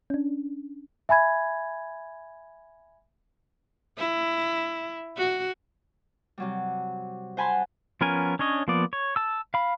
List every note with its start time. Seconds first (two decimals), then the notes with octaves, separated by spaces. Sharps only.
0.10 C#4 D4
1.09 E5 G#5 B5 G#6
3.98 E4
5.17 F#4
6.38 C3 F#3 G3
7.37 C5 F#5 G#5 A5 B5 C6
8.01 F3 B3 C#4 A#4 G#5
8.39 C#4 D4 C#5 D#5
8.68 F3 A#3 B3 D5
8.93 C#5
9.16 A5 E6
9.54 F5 B5